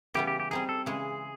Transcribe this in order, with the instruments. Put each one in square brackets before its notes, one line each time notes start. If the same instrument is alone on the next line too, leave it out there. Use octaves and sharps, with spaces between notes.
[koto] C#3 E3 G3 B3 [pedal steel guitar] G4
[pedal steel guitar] G4
G4
[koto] G3 C4 D#4 [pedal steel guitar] G#4
[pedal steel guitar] A4
[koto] C#3 E3 G#3 [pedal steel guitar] G#4